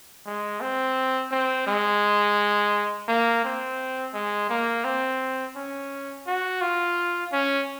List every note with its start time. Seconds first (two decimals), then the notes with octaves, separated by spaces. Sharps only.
0.26 G#3
0.61 C4
1.31 C4
1.67 G#3
3.08 A#3
3.44 C4
4.14 G#3
4.49 A#3
4.84 C4
5.56 C#4
6.27 F#4
6.61 F4
7.33 C#4